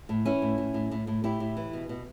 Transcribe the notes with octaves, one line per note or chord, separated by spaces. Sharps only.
A2
E3 C#4 E4
A2
A2
A2
A2
A2
A2 E4 G4
A2
E3
B2
B2